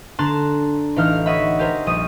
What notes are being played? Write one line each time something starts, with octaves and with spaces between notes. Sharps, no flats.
D3 D4 A5 A#5 C6 F#6
A1 E3 D#4 F5 F6
C#5 D#5 E5 F#5 B5
G4 G#4 A#4 C5
A#1 G3 D#6